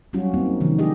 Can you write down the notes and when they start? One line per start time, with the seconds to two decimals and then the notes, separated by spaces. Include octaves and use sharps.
0.13 F#3 G3 C#4 F4 F#4
0.34 A#3 C4 D#4
0.61 C3 D#3 F3
0.79 G#3 D4 G4 G#4 D#5